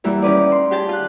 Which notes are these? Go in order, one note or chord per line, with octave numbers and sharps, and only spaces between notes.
E2 E3 G3 A#3 E4
D#3 C#4 B4 D5
C6
G4 G#4 G5 A5
F4 F#6